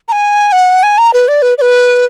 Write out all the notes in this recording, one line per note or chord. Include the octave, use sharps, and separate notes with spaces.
A#5
G#5
F#5
G#5
A#5
B4
D5
B4
D5
B4